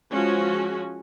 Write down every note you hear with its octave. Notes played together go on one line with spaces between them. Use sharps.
F3 G#3 C#4 F#4